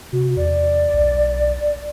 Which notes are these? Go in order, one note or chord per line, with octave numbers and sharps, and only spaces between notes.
C3 F#4
E2 D5
B1